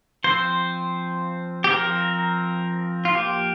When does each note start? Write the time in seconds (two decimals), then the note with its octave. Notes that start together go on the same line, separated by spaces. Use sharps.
0.24 F3 C4 C5
1.64 G4
1.69 F3 C4 A#4
3.05 F4
3.15 F3 A#3 G4